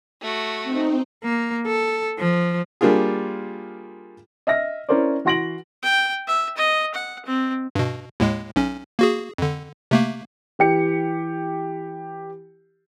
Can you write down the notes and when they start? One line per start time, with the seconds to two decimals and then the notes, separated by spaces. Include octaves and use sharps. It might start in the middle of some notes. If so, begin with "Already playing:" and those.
0.22 A3 F#4
0.64 C4 D#4
1.23 A#3
1.66 A4
2.18 F3
2.81 G3 A#3 D4 F4 G#4
4.47 D#5 E5 F6 A#6
4.89 C#4 E4 A#4 C5 D5
5.25 E3 F#4 C6 A#6 D7 F#7
5.83 G5
6.28 E5
6.57 D#5
6.94 F#5
7.26 C4
7.75 G2 B2
8.20 D#2 A2 G#3
8.56 B1 C#4
8.99 A#3 F#4 G#4
9.38 F2 D3
9.91 C3 A3 A#3
10.59 E3 G4 C#7